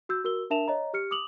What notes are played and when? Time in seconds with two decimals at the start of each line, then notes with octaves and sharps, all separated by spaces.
0.09 F#4 E6 G6
0.24 F#4 A#4 E6 G7
0.50 D4 A#4 E5 A5 E7 F7
0.68 C#5 D#5 A#5
0.93 G4 F6 C#7
1.11 D6 D#6 F7 F#7